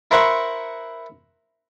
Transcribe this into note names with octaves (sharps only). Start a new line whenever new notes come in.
E4 A#4 C5 E5 F#5 C#6